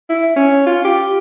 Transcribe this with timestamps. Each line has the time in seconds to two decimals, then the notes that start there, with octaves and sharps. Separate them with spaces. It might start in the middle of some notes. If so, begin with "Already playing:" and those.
0.09 E4
0.36 C#4
0.66 F4
0.84 G4